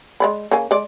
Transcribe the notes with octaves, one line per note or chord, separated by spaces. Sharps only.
G#3 D5 B5
C#3 A#3 G#5
G#3 D5